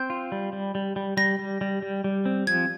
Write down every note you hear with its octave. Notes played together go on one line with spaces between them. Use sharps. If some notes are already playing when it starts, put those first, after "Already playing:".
Already playing: C4 G6
F4
G3
G3
G3
G3
G3 A#6
G3
G3
G3
G3
C4
F3 G#6